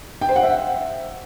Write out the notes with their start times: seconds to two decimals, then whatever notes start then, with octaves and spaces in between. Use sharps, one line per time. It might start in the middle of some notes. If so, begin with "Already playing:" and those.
0.21 G5
0.29 C5
0.36 F#5
0.43 E5